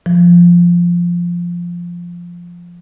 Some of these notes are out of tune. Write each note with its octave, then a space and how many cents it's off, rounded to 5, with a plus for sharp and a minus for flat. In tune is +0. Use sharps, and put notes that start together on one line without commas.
F3 -5